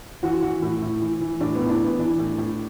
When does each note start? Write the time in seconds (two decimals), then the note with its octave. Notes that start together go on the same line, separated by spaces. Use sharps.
0.23 E3 F#4
0.42 E3 F#4
0.62 A2 E4
0.82 A2
1.02 E3
1.21 E3
1.40 A2 D4
1.55 A2 B3
1.66 E4
1.69 D4
1.80 E3 B3
1.99 E3 D4
2.19 A2
2.38 A2